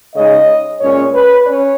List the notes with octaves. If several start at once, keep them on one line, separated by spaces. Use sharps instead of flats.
C#3 G#3 D#4 D#5
A#2 G#3 C#4 C#5
B4
C#4 C#5